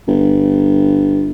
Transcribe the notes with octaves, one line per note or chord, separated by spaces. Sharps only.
G1